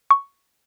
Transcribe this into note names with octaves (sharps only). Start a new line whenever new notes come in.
C#6